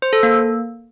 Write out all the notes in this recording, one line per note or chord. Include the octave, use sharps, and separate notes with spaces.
C5
A4
A#3